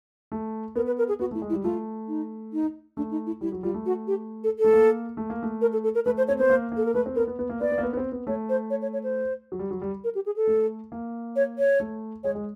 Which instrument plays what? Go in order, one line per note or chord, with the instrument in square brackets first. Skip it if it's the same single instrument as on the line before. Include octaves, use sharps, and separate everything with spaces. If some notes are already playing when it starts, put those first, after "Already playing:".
[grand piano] A3
[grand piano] B3 [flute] A#4
[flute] B4
A#4
G#4
[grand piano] B3 [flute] F#4
[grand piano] A3
[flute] E4
[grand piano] G#3
[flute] E4
[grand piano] G3
[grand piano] A3 [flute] F4
[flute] D#4
D#4
[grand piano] A3 [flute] D4
[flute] D#4
E4
[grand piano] G3 [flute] E4
[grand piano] F#3
[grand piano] G3 [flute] F4
[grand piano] A3
[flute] F#4
G4
A4
A4
[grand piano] A3
A#3
A3
A#3
A3
[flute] A#4
A4
A4
A#4
[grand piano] A3 [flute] B4
[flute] C5
[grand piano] C4 [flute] C#5
[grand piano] B3 [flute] C5
[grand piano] A#3
A#3
[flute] A4
A#4
[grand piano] A3 [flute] B4
[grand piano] C4
[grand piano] B3 [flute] A#4
[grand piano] B3
B3
A#3
[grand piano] B3 [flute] D5
[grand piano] B3
A#3
B3
B3
C4
B3
[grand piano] A3 [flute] C#5
[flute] C5
C#5
C#5
C#5
C5
[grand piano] F#3
G3
F#3
G3
[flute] A#4
G4
G#4
A4
[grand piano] A3
A#3
[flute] C#5
C#5
[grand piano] A3
[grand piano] G#3 [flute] C#5
[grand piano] G#3